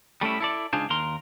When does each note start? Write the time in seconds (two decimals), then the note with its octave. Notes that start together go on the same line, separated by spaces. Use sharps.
0.21 G3 A3 C#4 E4
0.40 E4 A4 D5
0.73 C#2 D4 D#4 F4 G#4 C5
0.90 D#2 A#4 C6